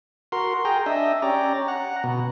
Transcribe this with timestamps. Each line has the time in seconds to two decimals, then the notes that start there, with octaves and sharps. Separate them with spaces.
0.32 F#4 A#4 C6
0.65 G#4 G5 A#5
0.86 D4 D#5 E5
1.22 C#4 G4 D5 A#5
1.68 F#5 A#5
2.04 B2